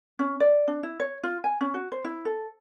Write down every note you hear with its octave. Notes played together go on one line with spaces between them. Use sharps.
C#4
D5
D4
E4
C#5
F4
G#5
C#4
F#4
C5
E4
A4